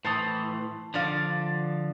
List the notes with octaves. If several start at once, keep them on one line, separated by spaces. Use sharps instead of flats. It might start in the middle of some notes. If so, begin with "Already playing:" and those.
A2 E3 C5 A5 D#6
D3 F3 D4 D5 F5